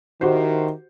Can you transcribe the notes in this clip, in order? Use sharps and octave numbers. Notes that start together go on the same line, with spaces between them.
D#3 E4 F#4 G4 C5